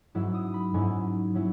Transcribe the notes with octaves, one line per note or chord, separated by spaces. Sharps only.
G#2 F#3 C#4 E4 E6
D#6
B5
G#2 F#3 C#4 E4 G#5
F#3 C#4 E4